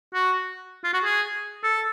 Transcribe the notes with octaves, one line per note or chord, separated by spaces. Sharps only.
F#4
F4
F#4
G#4
A4